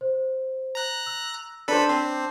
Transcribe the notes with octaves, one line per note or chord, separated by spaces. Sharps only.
C5
A#5 F#6
E6
D4 A4 B4 C5 B5
C4 C7